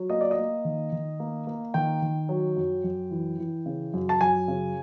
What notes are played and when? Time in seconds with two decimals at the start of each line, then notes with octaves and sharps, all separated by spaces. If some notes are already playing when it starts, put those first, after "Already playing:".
Already playing: F#3
0.10 A#3 D#5
0.21 D5
0.31 D#5
0.38 A#3
0.65 D#3
0.92 D#3
1.20 A#3
1.47 A#3
1.74 D#3 G5
2.02 D#3
2.29 F#3
2.56 F#2
2.84 F#2
3.11 E3
3.39 E3
3.66 C#3
3.94 F#2
4.09 A5
4.21 F#2 G#5
4.48 C#3